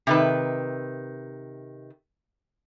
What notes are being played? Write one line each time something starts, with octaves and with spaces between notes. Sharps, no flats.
C3 D#3 B4